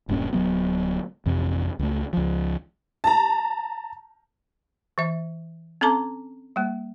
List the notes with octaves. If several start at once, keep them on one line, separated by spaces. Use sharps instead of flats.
D1 G2 A#2 C#4
D1 E2 F#3 B3
A1 F2 C3
C#2 A3
C#2 F3
A5 A#5
E3 E5
C4 C#4 A4 A5 A#5 D6
G3 A#3